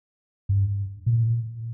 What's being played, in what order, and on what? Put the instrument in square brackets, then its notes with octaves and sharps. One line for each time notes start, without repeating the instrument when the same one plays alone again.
[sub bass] G2
A#2